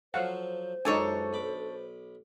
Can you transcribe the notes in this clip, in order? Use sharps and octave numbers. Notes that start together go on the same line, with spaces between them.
F3 F#3 A4 C5 F5 F#5
C#2 F#2 D4 D#4 A4 C#5 G#5
B1 B5 D6